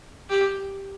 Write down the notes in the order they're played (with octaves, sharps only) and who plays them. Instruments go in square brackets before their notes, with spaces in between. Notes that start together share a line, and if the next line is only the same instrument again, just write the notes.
[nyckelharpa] G4